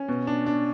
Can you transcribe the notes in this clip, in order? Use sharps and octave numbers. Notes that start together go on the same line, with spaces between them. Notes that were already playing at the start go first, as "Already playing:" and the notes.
Already playing: C#4
B2
D4
D4